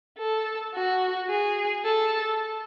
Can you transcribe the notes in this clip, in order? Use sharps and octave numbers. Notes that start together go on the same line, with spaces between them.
A4
F#4
G#4
A4